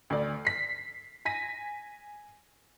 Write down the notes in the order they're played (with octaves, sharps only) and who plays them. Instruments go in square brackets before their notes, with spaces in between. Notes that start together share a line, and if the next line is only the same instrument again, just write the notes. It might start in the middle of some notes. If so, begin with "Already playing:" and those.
[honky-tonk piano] D2 D5
B6 C7
G#5 A#6 B6 D#7